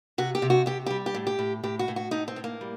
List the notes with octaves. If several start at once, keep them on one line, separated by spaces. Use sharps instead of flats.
C3 F#4
G4
C3
F#4
C3 G4
G3 G4
G4
A2
G4
A2
A2 G4
F#4
A2
F#4
A2 D#4
C4
A2
A#3
G3